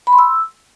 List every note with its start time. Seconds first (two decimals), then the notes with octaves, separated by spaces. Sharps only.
0.07 B5
0.13 C6
0.19 E6